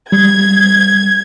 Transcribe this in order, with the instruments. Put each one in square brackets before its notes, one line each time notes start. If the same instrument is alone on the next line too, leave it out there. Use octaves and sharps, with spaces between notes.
[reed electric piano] G3 [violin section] G#6